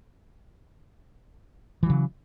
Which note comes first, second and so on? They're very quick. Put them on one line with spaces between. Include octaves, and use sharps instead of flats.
E3 F#3 C#3